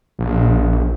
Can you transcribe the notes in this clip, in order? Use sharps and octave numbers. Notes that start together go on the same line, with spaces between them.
A#1